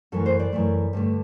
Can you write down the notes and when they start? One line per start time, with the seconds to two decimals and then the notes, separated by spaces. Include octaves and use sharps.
0.12 F#2 E3 A3 A4
0.26 C5
0.39 D5
0.52 F#2 E3 A3
0.93 G2 D3 A3